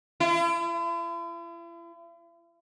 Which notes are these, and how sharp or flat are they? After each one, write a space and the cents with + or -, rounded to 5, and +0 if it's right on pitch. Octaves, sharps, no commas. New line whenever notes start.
E4 +45